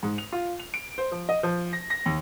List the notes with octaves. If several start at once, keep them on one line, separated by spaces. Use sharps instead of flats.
G#2
F7
F4
F7
D7
C5
F3
D#5
F3
A#6
A#6
D#2